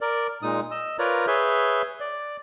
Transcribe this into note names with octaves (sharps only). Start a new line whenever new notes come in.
A#4 D5
A#2 G#3 D#4 D#6
D#5 E6
F4 A#4 B4 C#5 D5 A#5
G#4 B4 C#5 E5 G6
D5